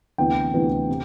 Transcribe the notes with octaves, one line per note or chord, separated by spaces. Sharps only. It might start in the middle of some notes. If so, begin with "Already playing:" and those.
D2 C3 E3 B3 G5
D2 C3 E3 B3
C3